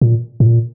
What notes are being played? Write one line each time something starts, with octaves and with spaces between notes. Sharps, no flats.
A#2
A2
A#2